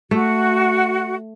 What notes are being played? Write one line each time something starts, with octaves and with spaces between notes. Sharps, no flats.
A3 F#4